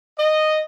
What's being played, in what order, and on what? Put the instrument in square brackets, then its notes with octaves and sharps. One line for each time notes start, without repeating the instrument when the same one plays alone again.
[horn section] D#5